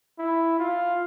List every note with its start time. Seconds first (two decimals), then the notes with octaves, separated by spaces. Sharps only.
0.19 E4
0.59 F4